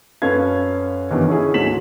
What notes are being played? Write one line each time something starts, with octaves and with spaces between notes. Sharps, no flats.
F#2 C#4 A4 B4 F5 G#6
G2 B2 D#3 E3
D3 C#4 E4 G#4
D2 G#2 F#3 B6 E7 F#7